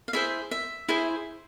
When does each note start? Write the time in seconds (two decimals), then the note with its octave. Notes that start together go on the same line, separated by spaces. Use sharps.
0.08 F5
0.13 E4 G#4 C5 E5
0.51 E5
0.89 E4 G#4 C5